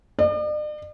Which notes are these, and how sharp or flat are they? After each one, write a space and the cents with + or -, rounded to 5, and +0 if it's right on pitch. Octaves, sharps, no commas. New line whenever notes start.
D5 +45